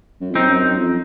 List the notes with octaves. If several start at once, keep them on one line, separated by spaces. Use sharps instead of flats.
F#2
F2
F#2 C4 D#4
F#2
F2